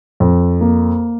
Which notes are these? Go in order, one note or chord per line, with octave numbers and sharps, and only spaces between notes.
F2
A#3